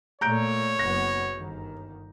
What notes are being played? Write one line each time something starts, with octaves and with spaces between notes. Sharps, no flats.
A#2 A3 C#5 A#5 G6 D7
F#1 B3 A#6
G1 D#3